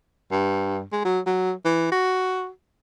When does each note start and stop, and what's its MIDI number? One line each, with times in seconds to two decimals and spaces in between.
0.32 0.83 43
0.92 1.01 56
1.05 1.20 54
1.26 1.53 54
1.65 1.87 52
1.92 2.49 66